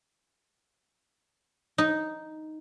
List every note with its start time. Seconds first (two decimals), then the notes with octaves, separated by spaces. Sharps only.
1.78 D#4